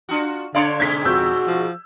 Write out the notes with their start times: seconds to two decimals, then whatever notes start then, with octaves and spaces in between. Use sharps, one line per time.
0.09 D4 F4 F#4
0.55 D3 D4 C#5 D5 F5 C6
0.80 G#2 B2 G#3 G#6 B6
1.05 F2 F#4 E6 G6
1.47 F3